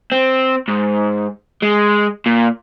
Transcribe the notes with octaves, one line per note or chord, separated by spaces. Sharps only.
C4
G#2
G#3
A#2